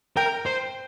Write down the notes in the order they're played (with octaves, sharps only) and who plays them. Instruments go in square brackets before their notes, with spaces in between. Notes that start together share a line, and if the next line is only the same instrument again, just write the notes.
[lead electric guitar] A#4 [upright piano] G5
[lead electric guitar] C5